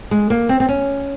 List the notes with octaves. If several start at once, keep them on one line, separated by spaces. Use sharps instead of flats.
G#3
A#3
C4
C4
C#4